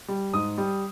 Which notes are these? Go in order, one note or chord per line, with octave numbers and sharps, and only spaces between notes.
G3
G#2 D#6
G3